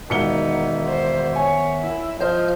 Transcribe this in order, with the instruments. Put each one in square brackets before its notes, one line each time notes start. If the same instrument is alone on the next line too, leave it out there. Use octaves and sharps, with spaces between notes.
[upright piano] E1 C#7 G7 [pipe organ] D#3 B3 E5 [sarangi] D#4
[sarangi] C5
[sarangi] C#5 [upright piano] G#5
[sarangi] E4
[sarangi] F3 [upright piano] C5 D#5 [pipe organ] F6 G6